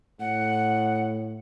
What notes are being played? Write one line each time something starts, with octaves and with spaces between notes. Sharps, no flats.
A2 F#5